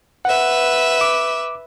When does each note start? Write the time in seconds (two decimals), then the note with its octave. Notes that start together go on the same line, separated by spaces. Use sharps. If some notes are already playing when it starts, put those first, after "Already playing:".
0.25 B4 E5 F#5
1.01 D6